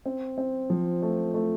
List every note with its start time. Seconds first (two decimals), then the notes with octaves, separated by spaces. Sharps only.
0.06 C4
0.38 C4
0.70 F3
1.02 A3
1.34 A3